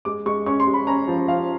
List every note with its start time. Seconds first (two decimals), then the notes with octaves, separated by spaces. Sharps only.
0.05 G#3 D6
0.26 G#3 C#6
0.46 C#4 C#6
0.60 C6
0.67 G#3
0.74 B5
0.87 C#4 A#5
1.08 F3
1.28 F3 F5